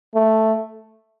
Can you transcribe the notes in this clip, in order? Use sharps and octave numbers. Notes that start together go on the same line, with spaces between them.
A3